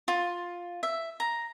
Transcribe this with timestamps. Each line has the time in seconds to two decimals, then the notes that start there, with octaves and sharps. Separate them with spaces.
0.08 F4
0.83 E5
1.20 A#5